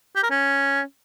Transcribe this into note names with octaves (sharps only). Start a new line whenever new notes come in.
G4
A#4
C#4